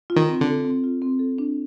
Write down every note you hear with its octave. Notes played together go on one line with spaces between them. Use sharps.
F4
D#3
C4
D3
A4
C4
F4
C4
A4
D4